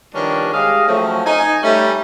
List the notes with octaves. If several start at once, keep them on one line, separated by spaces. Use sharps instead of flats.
D#3 F3 G3 B3 C#4 D4
G#3 G4 G#4 D#5 F5
F3 F#3 A3 C4 C#4
D#4 G#5
G3 A3 C#4